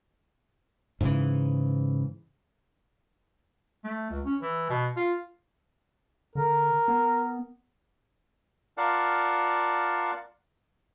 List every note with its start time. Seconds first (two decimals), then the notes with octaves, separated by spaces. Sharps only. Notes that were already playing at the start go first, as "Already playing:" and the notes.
1.01 G#2 C#3 E3
3.84 A3
4.10 C#2
4.25 C#4
4.41 E3
4.70 B2
4.97 F4
6.35 D3 A#4
6.88 B3
8.78 F4 A#4 D5 F5 F#5 A5